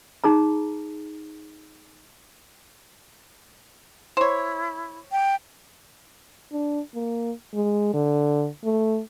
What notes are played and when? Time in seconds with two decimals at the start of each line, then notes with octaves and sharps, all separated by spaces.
0.24 D#4 G#4 A#5
4.17 E4 C5 C#5
5.12 G5
6.52 D4
6.95 A#3
7.54 G#3
7.94 D3
8.64 A3